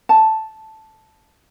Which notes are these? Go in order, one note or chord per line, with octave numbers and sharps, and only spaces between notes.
A5